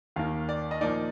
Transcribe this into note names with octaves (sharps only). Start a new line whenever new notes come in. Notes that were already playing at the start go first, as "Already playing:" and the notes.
D#2 D#3 A#3 F5
D5
D#5
A#2 F3 A#3 D#4 D5